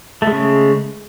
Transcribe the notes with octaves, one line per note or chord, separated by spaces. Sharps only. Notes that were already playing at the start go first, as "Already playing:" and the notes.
C#3 G#3 A3